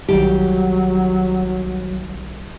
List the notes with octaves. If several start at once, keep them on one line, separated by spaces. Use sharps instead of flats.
B1 D#3 F#3 G3 G4